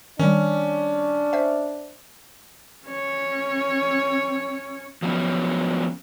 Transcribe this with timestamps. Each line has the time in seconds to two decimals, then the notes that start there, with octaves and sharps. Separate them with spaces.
0.19 D#3 G3 C#4 D4
1.33 C5 E5
2.86 C#4 C#5
5.02 F3 F#3 B3 C#4